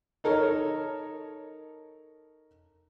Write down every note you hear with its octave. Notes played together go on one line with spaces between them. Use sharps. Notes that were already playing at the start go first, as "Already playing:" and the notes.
D#4 A4 A#4 C#5